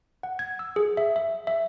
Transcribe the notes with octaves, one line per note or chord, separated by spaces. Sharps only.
F#5
G#6
E6
G#4
E5
E5
E5